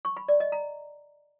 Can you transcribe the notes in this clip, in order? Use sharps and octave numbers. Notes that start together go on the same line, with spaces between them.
C#6
B5
D5
D#5
A#5